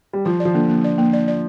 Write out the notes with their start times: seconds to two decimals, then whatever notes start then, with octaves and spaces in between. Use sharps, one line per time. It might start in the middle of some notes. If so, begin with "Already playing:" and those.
0.13 G3
0.25 F3 F4
0.40 D5
0.45 F3
0.54 D3 A#3
0.69 A#3
0.84 D5
0.98 A#3
1.13 D5
1.28 D5